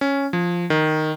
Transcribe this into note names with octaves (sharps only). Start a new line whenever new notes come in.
C#4
F3
D#3